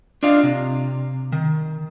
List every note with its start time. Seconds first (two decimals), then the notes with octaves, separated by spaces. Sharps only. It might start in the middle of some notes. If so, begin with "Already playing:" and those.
0.23 D4 F4 D5 D#5 F5
0.43 C3
1.32 D#3